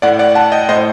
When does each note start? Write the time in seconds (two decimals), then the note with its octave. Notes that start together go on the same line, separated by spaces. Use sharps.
0.02 A2 D5 F#5
0.19 D5 F#5
0.35 F#5 A5
0.52 D#5 G5
0.69 A2 C5 D#5